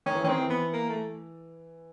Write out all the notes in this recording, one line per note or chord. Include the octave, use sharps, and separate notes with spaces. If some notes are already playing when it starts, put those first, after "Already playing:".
D#3 C#4
E3
D#3 C4 C#4
E3
B3
A#3
A3